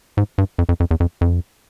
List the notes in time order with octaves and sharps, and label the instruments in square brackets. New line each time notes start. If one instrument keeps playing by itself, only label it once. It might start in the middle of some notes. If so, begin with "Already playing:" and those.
[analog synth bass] G#2
G2
F2
F2
F2
E2
F2
F2